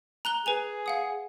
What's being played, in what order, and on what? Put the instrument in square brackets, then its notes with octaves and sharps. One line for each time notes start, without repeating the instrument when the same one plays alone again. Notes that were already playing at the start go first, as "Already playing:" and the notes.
[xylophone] A#5 F#6 G7
[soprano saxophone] G#4 [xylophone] B4 G#5 F7
[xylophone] F5 F#5 D#6